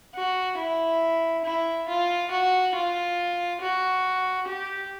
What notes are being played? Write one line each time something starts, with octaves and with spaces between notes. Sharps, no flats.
F#4
E4
E4
F4
F#4
F4
F#4
G4